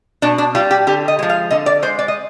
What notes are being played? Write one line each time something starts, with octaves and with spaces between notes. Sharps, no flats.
B2 D4
D4
G3 F4
G4
D3 G4
D#5
F3 G#3
F5
D3 D#5
D5
G#3 C5
D5
D#5